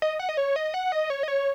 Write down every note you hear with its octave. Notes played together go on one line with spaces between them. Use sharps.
D#5
F#5
D#5
C#5
D#5
F#5
D#5
C#5
D#5
C#5